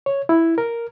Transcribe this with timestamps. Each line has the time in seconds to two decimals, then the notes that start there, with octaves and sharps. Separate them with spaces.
0.06 C#5
0.29 E4
0.58 A#4